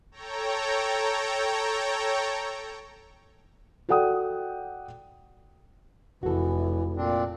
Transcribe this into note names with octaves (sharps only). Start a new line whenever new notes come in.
A4 C#5 G5 A#5
F#4 A4 D5 F#5 G5 D#6
F1 E3 E4 F#4 A4
A#2 C4 D4